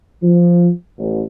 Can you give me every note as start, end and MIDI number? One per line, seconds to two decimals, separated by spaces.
0.23 0.69 53
0.99 1.22 33